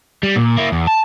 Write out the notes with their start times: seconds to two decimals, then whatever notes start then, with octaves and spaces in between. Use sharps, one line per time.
0.23 G3
0.36 A#2
0.57 A#3 E4
0.72 E2
0.87 A5